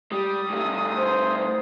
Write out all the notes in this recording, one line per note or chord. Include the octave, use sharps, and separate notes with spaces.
G3 D#6
G2 A3
C5